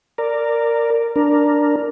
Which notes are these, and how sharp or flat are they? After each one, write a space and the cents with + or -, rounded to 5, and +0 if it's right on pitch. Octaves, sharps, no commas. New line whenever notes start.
A#4 -10 D5 +0
D4 +0 A#4 +5